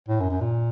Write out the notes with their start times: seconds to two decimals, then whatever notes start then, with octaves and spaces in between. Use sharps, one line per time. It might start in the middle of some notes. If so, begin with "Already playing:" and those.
0.08 A2
0.20 F#2
0.31 F#2
0.41 A#2